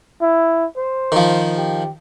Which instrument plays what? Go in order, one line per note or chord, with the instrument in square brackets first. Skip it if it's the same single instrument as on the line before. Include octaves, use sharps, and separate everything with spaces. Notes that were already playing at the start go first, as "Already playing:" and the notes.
[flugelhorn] E4
C5
[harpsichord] D#3 F3
[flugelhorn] G4